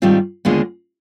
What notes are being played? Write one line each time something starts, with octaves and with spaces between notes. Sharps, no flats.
G#2 D#3 G3 C4 F4
D#2 D3 G#3 B3 F4